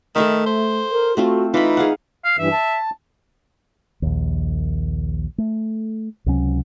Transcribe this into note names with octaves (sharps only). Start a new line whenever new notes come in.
D#3 A3 A4 E5 B5
C5
A#4
A3 C4 F4 F#4
E3 D#4 F4 B5
G#4 F5 F#5
F5
G2 E3 E5
A5
A#1 D#2
A3
C#2 C3 F#3 C#4